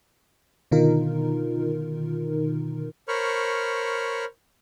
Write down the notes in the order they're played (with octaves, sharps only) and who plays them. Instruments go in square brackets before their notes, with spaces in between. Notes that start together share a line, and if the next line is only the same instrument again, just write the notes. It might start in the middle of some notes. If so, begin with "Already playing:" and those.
[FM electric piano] B2 D3 D#3 D#4 F4 A#4
[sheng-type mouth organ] A#4 C5 C#5 B5 C#6 F6